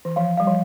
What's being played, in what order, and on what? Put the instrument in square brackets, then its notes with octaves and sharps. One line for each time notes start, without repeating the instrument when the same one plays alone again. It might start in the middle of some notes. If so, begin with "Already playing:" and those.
[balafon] E3
[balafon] F3 [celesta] F5
[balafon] G3 [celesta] F5
[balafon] F3